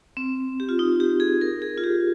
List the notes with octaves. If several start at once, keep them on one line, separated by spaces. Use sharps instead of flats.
C4
G4
F4
D#4
G4
G#4
A#4
G#4
F4
G4